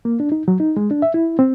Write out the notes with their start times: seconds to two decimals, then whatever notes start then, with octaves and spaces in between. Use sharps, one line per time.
0.05 A#3
0.20 D4
0.32 D#4
0.48 F#3
0.60 D#4
0.77 G#3
0.91 D4
1.02 E5
1.14 E4
1.39 C4